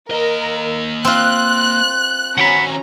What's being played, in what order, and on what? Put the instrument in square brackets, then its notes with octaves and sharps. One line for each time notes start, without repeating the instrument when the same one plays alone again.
[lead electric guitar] A#3 D#5 [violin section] A#4
[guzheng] C4 F4 [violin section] F#6
[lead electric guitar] D#3 F#4 [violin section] C#4 A#5 [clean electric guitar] F#5 G5 B5